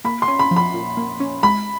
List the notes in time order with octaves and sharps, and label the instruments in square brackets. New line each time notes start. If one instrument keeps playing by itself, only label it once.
[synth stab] A#3 [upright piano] B5
[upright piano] C6
[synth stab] C#4
[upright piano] B5
[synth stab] F3
[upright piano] B5
[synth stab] A#2
A#3
C#4
[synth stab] G#3 [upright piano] B5